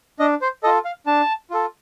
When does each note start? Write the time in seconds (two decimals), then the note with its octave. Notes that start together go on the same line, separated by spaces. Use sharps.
0.19 D4 D#5
0.41 C5
0.63 A4 D#5
0.66 F4
0.85 F5
1.06 D4 A5
1.50 F4 A4